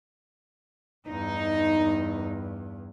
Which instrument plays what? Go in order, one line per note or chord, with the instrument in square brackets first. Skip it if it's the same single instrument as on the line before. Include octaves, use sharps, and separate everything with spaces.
[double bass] E2 G2 [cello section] D#4